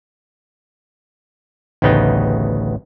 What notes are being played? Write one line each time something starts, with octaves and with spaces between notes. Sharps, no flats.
A1 D2 C#3 B3 D#4 G5